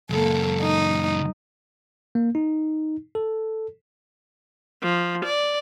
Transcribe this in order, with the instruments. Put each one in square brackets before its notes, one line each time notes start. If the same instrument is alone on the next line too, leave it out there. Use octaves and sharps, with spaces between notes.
[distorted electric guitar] C#2 F#2 [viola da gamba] A#3 A4
[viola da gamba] D#4
[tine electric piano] A#3
D#4
A4
[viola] F3
D5